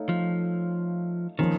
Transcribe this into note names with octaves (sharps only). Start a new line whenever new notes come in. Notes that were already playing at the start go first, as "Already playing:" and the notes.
Already playing: A3 D#4 A4 C#5 F5
F3
D#3 F3 A#3 C#4